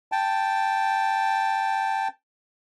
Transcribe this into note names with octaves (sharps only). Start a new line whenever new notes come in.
G5 A5